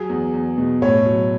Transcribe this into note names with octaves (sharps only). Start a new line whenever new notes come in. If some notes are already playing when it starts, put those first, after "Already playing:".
Already playing: F#3 G#4
E2
E2
B2
A2 C#5
F#3